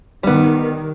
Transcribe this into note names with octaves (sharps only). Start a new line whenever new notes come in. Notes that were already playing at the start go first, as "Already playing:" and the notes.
D#3 G3 B3